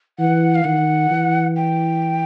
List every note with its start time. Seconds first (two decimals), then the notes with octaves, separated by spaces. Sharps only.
0.19 E3 F#5
0.55 F5
0.64 D#3 F#5
1.11 E3
1.56 G5